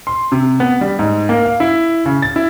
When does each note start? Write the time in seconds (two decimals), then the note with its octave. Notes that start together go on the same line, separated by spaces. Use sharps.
0.07 C6
0.32 C3
0.60 B3
0.81 G3
0.99 G#2
1.29 A#3
1.45 F5
1.60 E4
2.06 C#3
2.22 A6
2.36 E4